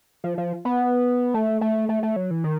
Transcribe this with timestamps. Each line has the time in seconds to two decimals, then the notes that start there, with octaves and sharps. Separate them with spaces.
0.24 F3
0.38 F3
0.65 B3
1.34 A3
1.61 A3
1.89 A3
2.03 A3
2.16 F#3
2.31 E3
2.44 D#3